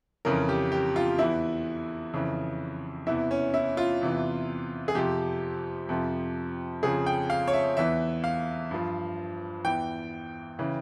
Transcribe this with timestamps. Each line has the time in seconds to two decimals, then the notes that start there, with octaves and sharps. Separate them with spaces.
0.25 F2 C#3 E3 A#4
0.49 G4
0.72 G4
0.96 F4
1.18 E2 E3 E4
2.13 F2 C#3 E3
3.06 E2 C3 E3 E4
3.31 C#4
3.54 E4
3.77 F4
4.01 E2 C3 E3
4.88 G#4
4.95 F2 C3 F3 G4
5.89 F2 C3 F3
6.82 F2 C#3 F3 G#4
7.06 G5
7.30 F5
7.48 C#5
7.53 E5
7.77 E2 E3 E5
8.24 F5
8.71 G2 F3
9.64 E2 E3 G5
10.59 C#3 E3